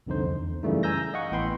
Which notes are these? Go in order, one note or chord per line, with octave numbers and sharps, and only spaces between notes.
C2 F2 D3 D#4 C5
E2
F#2 C#3 E3 G3 A3 D#4
G#5 A#5 E6 G6 A#6
D#5 F5 F#5 C#6
A1 A2 B3 G5 B5 C6